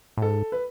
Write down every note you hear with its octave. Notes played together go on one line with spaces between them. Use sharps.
A2
G#2 A4
B4